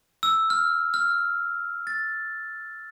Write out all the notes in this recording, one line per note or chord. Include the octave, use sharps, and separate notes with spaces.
E6
F6
F6
A6